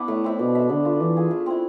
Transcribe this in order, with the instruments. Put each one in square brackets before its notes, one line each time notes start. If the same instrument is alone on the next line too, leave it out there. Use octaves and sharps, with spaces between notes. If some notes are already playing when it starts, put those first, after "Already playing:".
Already playing: [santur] B3 D4 E4
[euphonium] A2 [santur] A3
[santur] C4 E4
[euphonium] B2 [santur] D4
[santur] A4 E5
[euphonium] D3 [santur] B3
[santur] F4 B4
[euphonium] E3 [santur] D4
[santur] F4 G#4
A3
C4 E4